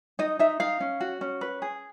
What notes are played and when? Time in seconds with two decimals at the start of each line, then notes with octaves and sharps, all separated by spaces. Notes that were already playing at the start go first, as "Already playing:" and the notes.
0.19 D#4 D#5
0.39 D#4 E5
0.60 D#4 F5
0.80 C#4
1.00 F#4
1.21 C#4
1.41 B4
1.62 G#4